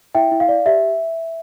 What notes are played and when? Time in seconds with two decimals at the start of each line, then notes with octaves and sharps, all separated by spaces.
0.15 E4 E5 G5
0.31 E4
0.40 F5
0.49 D5
0.66 G4 E5